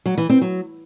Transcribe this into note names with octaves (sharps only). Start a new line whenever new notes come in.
F#3
E3
C4
F#3